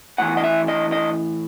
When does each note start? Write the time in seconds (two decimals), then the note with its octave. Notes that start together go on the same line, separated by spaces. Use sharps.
0.18 A2 E3 F#5
0.37 D#5
0.44 E5
0.68 D#5
0.92 D#5